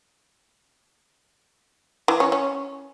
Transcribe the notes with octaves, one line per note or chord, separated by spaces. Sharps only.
E3
C#4
C#4